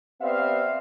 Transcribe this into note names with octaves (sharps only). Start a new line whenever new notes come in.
B3 C4 G4 D5 E5 F5